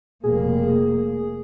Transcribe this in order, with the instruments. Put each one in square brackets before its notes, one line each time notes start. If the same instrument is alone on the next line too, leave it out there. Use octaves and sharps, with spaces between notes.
[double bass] F1 A#3 [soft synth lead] G#4